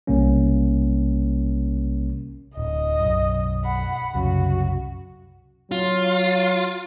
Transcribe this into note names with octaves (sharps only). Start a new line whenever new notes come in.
B1 C3 G3 A#3 C#4
D1 D#5
B1 F#2
F#5 B5
C2 F#2 C#3 F#4
F#3 F4